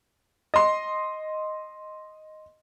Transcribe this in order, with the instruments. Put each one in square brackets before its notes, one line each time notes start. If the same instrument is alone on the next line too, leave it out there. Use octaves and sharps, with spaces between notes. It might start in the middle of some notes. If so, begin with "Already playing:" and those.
[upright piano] D#5 C6